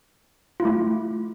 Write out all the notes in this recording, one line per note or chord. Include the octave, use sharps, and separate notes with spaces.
A3 E4 F4